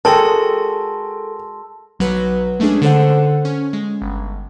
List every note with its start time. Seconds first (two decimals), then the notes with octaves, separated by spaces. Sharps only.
0.05 G#3 F#4 A4 A#4 G5 A5 C6 E6
1.99 B1 F#3 F#4 B4
2.60 G#3 A3 C#4 D4 G#4
2.82 D3 A4 C5 F#5
3.45 C#4
3.73 G#3
4.02 G1